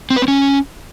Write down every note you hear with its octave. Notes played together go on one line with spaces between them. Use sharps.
C4
B4
C4
C#4